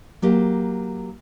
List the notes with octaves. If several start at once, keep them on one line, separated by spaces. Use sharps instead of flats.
F#3 A#3 G4